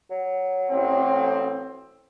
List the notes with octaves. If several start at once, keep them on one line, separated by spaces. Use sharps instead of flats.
F#3
A1 C4